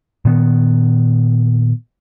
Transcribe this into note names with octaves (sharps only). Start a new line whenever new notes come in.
A#2 D#3 B3